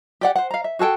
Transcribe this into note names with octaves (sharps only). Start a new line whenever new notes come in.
G4 D5 F#5
C5 F#5
F5 A#5
E5
F#4 G#4 A4 G5